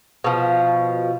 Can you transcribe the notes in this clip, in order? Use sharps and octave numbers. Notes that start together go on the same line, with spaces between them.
B2 F3